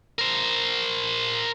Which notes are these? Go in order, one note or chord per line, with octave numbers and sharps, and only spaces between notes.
A#4 C5